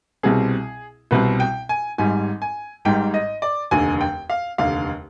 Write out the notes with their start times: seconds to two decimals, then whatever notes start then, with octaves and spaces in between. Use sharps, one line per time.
0.23 C2 B2 G3 C4 G#4
1.11 C2 B2 G3 C4 B4
1.40 G5
1.69 G#5
1.98 G#1 G#2 G3 G#5
2.42 G#5
2.85 G#1 G#2 G3 G5
3.14 D#5
3.42 D5
3.71 F1 D#2 D3 G#5
4.01 G5
4.30 F5
4.58 F1 D#2 D3 F5